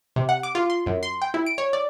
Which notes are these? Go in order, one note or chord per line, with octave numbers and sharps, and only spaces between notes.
C3
F#5
D6
F4
C6
F#2
C6
G5
E4
D7
C#5
D5